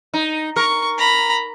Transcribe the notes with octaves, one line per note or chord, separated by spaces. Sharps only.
D#4
A#4 C#6
A#5 B5